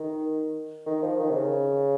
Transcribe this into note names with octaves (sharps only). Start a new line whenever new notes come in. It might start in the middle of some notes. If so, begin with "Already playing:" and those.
Already playing: D#3
D#3
F3
D#3
C3
C#3